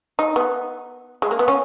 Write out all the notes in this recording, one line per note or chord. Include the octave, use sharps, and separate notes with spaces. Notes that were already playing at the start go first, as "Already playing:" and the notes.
D#4
B3
G#3
A#3
B3
C#4